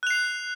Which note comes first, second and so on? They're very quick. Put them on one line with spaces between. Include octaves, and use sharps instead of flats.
F#6 F7 C7